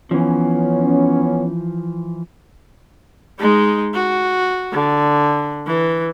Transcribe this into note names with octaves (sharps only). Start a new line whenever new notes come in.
E3 F3 B3 C#4
G#3 D#4
F#4
D3
E3